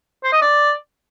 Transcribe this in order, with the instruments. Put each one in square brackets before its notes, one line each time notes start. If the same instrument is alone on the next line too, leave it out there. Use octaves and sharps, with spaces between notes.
[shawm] C5
D#5
D5